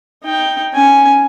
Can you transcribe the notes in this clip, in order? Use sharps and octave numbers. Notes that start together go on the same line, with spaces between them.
D#4 G5
C#4 G#5